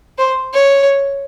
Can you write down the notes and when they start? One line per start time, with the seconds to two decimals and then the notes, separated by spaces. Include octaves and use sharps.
0.18 C5
0.53 C#5